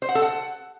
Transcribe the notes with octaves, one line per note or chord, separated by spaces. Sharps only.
C5
F#5
A4
F#5